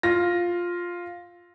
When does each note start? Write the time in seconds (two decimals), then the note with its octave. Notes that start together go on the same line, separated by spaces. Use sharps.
0.03 F4 A#6